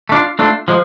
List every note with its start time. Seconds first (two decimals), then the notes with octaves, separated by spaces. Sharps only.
0.09 A3
0.12 D4 F4
0.39 A3 D4 F4
0.68 F3 G#3